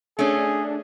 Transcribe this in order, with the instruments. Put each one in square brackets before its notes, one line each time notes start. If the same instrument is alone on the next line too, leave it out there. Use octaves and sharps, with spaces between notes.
[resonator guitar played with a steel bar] A3 C#4 [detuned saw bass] D4 [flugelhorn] G#4